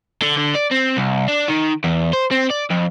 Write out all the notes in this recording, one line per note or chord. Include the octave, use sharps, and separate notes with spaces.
D3
D3
D5
C4
C2
D4
D#3
E2
C5
C4
D5
F2